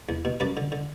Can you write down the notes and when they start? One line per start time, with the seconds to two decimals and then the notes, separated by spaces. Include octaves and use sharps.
0.09 E2
0.25 B2
0.40 F#2 B4 D5
0.57 D3
0.72 D3